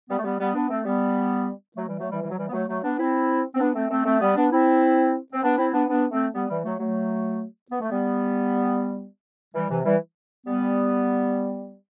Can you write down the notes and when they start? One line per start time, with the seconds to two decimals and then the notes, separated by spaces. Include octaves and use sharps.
0.09 G3 B3
0.18 A3
0.24 G3 B3
0.39 G3 B3
0.55 B3 D4
0.70 A3 C4
0.85 G3 B3
1.76 F#3 A3
1.88 E3 G3
1.99 F#3 A3
2.11 E3 G3
2.22 E3 G3
2.30 F#3
2.38 E3 G3
2.49 B3
2.53 F#3 A3
2.68 F#3 A3
2.83 B3 D4
2.99 C4 E4
3.54 C4
3.60 B3 D4
3.75 A3 C4
3.90 A3 C4
4.05 A3 C4
4.21 G3 B3
4.36 B3 D4
4.51 C4 E4
5.33 C4
5.43 B3 D4
5.58 C4 E4
5.73 B3 D4
5.88 B3 D4
6.11 A3 C4
6.34 G3 B3
6.49 E3 G3
6.65 F#3 A3
6.80 F#3 A3
7.71 B3
7.81 A3
7.90 G3 B3
9.55 E3 G3
9.70 C3 E3
9.85 E3 G3
10.46 G3 B3